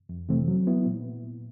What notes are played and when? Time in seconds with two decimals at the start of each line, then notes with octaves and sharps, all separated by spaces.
0.09 F2
0.29 C3 E3 A3 C4
0.48 F#3
0.67 B3 E4
0.86 A#2